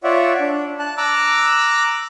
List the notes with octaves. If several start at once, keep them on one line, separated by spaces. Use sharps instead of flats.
F4 C#5 D5 E5 F#5
D4
A5 F#6
A#5 D6 E6 F#6